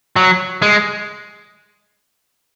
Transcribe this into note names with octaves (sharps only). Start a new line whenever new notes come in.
F#3
G#3